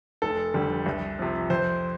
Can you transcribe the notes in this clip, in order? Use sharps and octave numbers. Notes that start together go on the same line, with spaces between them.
F1 A4
F2 D3 G3
C2
C3 F3
F2 C5